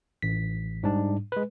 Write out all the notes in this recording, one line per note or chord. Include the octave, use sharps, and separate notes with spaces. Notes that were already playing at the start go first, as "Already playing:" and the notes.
A1 B6
G#2 G3 D4
G#3 B4